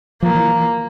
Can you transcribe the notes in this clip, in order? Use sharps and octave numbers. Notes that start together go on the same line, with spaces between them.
F3 A#3
E3